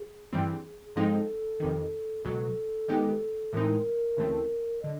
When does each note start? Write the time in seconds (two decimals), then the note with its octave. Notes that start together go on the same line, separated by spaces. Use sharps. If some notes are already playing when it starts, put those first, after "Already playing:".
Already playing: G#4
0.33 G2 E3 G3 C4
0.96 G#2 F3 G#3 C4 D#4 A4
1.60 F2 C3 D#3
2.25 C#2 B2 F#3 A4
2.88 D#3 G#3 B3 D#4 G4
3.53 A2 E3 G#3 C4 D#4 A#4
4.17 D2 C#3 E3 A3 C4
4.82 D3 D#5